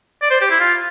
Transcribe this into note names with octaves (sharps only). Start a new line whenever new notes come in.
D5
C5
G4
E4
F4